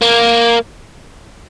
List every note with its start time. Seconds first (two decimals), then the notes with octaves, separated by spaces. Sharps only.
0.02 A#3